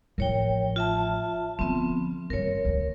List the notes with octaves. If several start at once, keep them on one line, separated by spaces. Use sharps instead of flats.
A1 F3 A#4 C#5 G5
F4 E5 A5
D3 F3 B3 C4
G1 G2 A#4 C#5
D2 D3